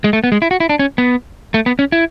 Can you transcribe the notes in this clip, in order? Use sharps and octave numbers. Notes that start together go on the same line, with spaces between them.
G#3
A3
B3
G#3
E4
F#4
E4
D4
C#4
B3
A3
B3
C#4
E4